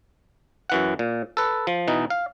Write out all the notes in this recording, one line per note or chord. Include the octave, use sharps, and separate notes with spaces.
F#2 E3 F#5
A#2
A4 B4
F3
B2 E3 D#4
F5